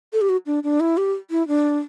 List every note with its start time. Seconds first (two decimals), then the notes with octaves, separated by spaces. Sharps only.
0.13 A4
0.21 G4
0.29 F#4
0.46 D4
0.63 D4
0.80 E4
0.97 G4
1.31 E4
1.48 D4